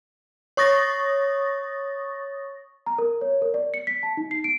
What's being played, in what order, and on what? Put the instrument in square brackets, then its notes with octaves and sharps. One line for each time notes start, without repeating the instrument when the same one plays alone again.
[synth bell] C#5 C#6 D#6 A6 A#6
[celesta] A#5
A#4
C#5
A#4
D5
C#7
B6
A5
D#4
C7
D7